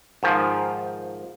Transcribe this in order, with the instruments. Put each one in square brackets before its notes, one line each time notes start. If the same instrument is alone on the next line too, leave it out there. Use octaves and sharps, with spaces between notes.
[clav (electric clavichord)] G#2 D#3 F3